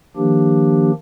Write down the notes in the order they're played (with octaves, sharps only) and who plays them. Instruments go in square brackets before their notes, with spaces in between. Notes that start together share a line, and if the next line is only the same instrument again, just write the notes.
[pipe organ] D#3 F3 A#3 D4 G4